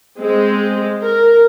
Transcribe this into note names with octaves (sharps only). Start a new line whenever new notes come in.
G#3 C4
A#4